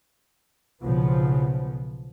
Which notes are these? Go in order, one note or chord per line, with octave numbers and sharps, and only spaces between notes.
B1 C#3 F3 B3